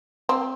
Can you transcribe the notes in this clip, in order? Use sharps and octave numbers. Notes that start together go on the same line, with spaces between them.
C4